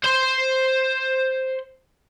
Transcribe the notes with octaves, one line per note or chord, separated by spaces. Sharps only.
C5 C6